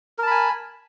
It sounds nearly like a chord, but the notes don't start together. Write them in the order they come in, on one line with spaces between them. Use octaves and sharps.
A#4 A5 B5 G#5